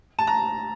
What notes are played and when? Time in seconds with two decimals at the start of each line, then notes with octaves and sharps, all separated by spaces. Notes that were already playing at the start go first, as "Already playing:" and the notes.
0.19 A5
0.27 A#5